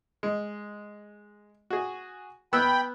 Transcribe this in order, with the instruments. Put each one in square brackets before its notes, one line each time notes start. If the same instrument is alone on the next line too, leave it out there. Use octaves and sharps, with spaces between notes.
[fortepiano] G#3
F#4 G#4
[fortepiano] B3 E6 F#6 [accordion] G5 B5